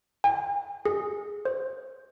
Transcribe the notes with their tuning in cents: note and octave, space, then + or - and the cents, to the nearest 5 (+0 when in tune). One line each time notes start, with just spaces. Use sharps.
G#5 -45
G#4 -10
C5 +0